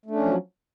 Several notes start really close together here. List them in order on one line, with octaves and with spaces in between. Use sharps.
A3 D4 C#4 F3 F#3